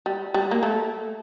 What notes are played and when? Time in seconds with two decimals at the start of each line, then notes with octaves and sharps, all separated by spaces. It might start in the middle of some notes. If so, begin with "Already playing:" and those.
0.06 G3
0.34 G3
0.51 A#3
0.63 A3